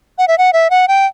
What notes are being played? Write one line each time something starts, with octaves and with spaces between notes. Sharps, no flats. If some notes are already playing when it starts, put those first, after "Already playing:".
F#5
E5
F#5
E5
F#5
G5